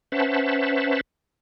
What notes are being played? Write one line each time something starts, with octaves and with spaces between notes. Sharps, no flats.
C#4 B4 C5 E5 F#5 A5